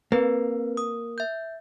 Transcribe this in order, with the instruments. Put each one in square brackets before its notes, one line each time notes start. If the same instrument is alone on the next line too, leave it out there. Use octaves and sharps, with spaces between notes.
[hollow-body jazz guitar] A#3 [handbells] C4 B4
[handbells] D#6
E5 G6